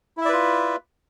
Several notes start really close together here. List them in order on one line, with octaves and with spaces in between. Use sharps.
E4 E5 D5 B4 F4